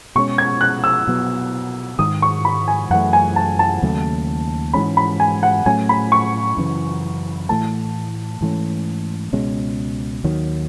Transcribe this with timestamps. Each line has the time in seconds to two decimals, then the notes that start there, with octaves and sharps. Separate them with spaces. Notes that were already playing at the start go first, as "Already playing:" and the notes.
0.15 B2 G#3 C#4 C#6
0.38 G#6
0.61 F#6
0.84 E6
1.07 B2 F#3 B3
1.99 G#2 D#3 G#3 D#6
2.22 C#6
2.45 B5
2.68 G#5
2.90 F#2 E3 A3 F#5
3.13 G#5
3.36 A5
3.59 A5
3.82 D#2 C#3 F#3 A3
4.73 G#2 E3 G#3 C#4 B5
4.97 B5
5.20 G#5
5.43 F#5
5.66 A2 F#3 A3 C#4 G#5
5.89 B5
6.12 C#6
6.57 F#2 C#3 E3
7.49 A2 E3 A3 A5
8.41 G#2 E3 A3 C#4
9.33 C#2 B2 G#3 C#4
10.24 D#2 D#3 F#3